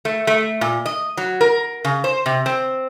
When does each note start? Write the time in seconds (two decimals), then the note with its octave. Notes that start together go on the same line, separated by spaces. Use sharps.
0.05 A3
0.27 A3
0.61 A#2
0.86 D#5
1.17 F#3
1.41 A#4
1.85 C#3
2.04 C5
2.26 C3
2.46 C4